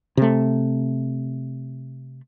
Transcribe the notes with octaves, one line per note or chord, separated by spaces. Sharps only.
C3 A3